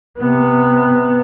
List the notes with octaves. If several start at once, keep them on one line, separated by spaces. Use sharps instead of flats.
C3 B3